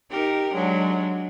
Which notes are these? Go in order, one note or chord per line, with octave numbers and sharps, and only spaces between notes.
D#4 G4 A#4
F#3 G#3 D4